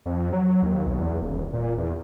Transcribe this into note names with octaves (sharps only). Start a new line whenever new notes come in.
F2
F#3
D#2
B1
E2
D#1
A#2
E2